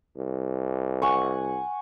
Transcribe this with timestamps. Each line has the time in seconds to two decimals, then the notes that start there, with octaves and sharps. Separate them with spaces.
0.17 C2
1.02 F#5 G#5 C#6